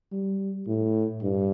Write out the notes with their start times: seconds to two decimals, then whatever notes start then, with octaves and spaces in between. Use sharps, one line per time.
0.12 G3
0.67 A2
1.23 G2